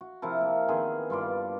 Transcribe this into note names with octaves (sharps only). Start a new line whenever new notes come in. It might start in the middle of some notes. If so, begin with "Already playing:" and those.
F#4
C3 F3 E4 A#4
A#3
D#3 B3 C4 G#4
G2 F4 D5